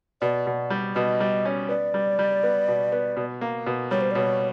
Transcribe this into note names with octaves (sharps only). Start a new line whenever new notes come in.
B2 D5
B2
G3
B2 D#5
G3
C#4
B3 D5
G3
G3
B3
B2
B3
B2
A#3
B2
G3 C#5
C5
D5
B2 C#5